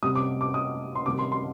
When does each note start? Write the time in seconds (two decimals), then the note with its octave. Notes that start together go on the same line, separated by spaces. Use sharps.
0.03 C3 G3 D#6
0.16 D6
0.41 D6
0.54 D#6
0.95 C6
1.06 C3 D#3 G3 D6
1.19 C6
1.32 C6